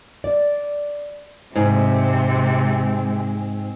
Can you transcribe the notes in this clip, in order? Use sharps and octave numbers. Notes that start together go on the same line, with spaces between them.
D5
G#2 C3 G#3 C4